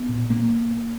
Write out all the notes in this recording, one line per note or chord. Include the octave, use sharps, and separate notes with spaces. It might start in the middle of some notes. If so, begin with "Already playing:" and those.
Already playing: B3
A#2
A#2 A#3